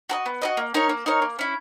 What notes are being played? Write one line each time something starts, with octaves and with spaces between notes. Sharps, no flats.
F#4 A#4 D#5
B3
F#4 A#4 D#5
A#3
D#4 A#4 C#5
A#3
D#4 A#4 C#5
A#3
C#4 E4